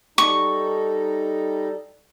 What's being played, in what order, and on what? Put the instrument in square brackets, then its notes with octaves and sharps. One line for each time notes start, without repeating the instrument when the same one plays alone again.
[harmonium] G3 D#4 A4 [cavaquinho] C#6